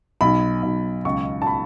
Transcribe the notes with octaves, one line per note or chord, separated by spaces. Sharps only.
B1 B5
B1
C#2 C#6
A5
B5